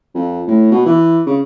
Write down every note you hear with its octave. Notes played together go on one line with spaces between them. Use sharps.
F2
A2
B2
E3
C#3